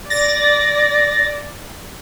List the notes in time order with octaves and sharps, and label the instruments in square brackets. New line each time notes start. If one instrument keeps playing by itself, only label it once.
[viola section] D5 [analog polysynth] A6 A#6